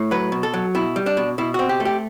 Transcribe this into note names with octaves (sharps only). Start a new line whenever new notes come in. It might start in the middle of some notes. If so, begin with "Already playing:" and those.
Already playing: A2
F#3 B4
B2
A4
F#3
B2 E4
G3
D4
B2
B2 E4
C4 F#4
G4
A3
G4